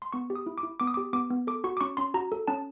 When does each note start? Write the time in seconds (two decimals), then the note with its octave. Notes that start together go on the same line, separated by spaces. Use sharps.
0.02 C6
0.13 B3 C#6
0.30 G4
0.35 D#6
0.46 E4
0.58 D6
0.63 E4
0.80 B3 D6
0.87 D#6
0.94 G4 D6
1.13 B3 D6
1.30 B3
1.47 A4 D6
1.64 F#4 C#6
1.77 D6
1.81 C#4 C#6
1.97 C#4 C6
2.14 F#4 A#5
2.32 A4
2.48 C#4 A5